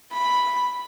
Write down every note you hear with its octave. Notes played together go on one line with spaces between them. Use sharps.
B5